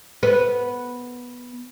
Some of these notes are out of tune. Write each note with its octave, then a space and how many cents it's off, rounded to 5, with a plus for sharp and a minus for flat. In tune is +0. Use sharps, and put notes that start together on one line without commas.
B3 -10